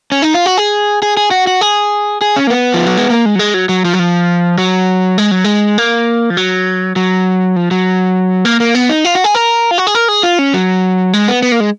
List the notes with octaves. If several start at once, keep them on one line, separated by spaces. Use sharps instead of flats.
C#4
D#4
F4
F#4
G#4
G#4
G#4
F#4
F#4
G#4
G#4
C#4
A#3
B3
F3
F#3
G#3
A#3
G#3
F#3
G#3
F#3
F#3
F3
F#3
F3
F#3
G#3
F#3
G#3
A#3
F3
F#3
F#3
F3
F#3
A#3
A#3
B3
D#4
F4
F#4
G#4
A#4
F4
F#4
G#4
A#4
G#4
F4
C#4
F#3
G#3
B3
B3
A#3
G#3